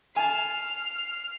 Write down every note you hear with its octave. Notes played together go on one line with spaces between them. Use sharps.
G#5 A5 F6 C7